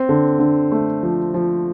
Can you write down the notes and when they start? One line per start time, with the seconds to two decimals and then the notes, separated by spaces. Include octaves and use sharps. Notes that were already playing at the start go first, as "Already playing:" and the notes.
Already playing: C4
0.09 D3
0.39 D3
0.72 A3
1.03 F3
1.34 F3